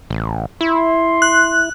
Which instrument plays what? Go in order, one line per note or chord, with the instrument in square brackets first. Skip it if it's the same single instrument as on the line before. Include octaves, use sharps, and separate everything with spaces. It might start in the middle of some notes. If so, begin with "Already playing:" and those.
[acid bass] A1
[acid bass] E4 [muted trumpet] C6
[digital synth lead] F#6